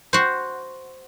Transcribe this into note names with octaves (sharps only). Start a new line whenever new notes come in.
F#4 C5